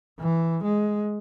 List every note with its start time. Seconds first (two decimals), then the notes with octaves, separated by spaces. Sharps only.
0.19 E3
0.63 G#3